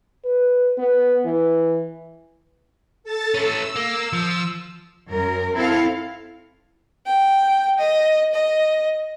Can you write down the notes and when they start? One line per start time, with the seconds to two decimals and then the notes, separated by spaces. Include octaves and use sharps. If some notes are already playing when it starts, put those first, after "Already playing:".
0.25 B4
0.78 B3
1.25 E3
3.04 A4 A5 A6
3.34 A3 C#4 E6
3.76 A#3
4.13 F3
5.11 F#2 A#4
5.55 C4 E4 A4 F5
7.06 G5
7.79 D#5
8.34 D#5